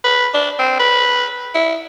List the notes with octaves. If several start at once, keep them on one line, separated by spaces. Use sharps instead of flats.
B4
D4
C4
B4
E4